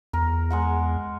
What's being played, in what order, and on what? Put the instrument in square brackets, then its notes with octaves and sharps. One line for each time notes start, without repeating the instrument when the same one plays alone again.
[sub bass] E2 [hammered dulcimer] A#4
[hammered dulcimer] G#3 A#4 F#5